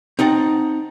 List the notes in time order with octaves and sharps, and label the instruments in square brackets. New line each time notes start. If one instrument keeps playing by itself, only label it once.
[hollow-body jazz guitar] C4 D#4 F#5 A5